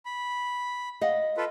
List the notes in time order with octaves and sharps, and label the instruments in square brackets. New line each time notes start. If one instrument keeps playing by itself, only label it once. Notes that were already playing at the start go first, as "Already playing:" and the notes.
[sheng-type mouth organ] B5
[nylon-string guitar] D#5 F5 F#5
[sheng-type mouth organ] F4 A4 B4